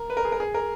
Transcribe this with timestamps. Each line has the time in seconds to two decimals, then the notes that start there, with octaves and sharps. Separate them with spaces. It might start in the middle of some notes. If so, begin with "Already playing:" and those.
Already playing: A#4
0.10 B4
0.17 A#4
0.25 G#4
0.32 A#4
0.40 G#4
0.54 A#4